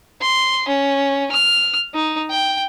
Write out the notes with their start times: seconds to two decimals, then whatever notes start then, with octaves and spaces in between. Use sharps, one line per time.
0.21 C6
0.68 C#4
1.31 F6
1.94 D#4
2.30 G5